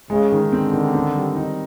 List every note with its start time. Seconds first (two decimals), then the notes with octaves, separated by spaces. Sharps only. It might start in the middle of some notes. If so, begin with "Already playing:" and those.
0.10 C#3 G#3
0.32 D#3
0.52 D3 C4
0.73 D#3
0.94 C4
1.15 G3
1.36 D#4